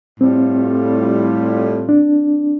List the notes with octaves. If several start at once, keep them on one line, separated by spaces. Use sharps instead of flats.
A2 G3 C4 F4
D4